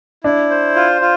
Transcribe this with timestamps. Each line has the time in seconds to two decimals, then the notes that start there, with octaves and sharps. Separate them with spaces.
0.24 D4 E4
0.50 C5
0.76 F4
1.01 F4